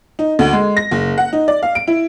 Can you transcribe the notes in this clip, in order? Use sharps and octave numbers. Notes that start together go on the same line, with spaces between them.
D#4
D2
G#3
A#6
F#1
F#5
D#4
D5
F5
D7
E4